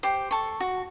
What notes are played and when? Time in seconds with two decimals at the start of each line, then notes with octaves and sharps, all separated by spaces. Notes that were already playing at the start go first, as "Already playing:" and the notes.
0.03 G4 C5
0.31 A4 C#6
0.60 F#4